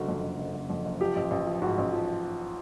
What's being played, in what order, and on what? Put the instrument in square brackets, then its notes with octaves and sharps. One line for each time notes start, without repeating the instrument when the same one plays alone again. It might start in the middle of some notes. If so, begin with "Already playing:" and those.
Already playing: [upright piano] F#1 D3 F#4
F2
F#1
F#1
F#1
F2
F#1
F3 G4
A1
A1
F3
G#2 F#4
A1
F3